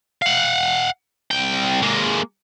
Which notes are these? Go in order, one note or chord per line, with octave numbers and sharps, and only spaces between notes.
F5 F#5
C2 G5
G#3 A#3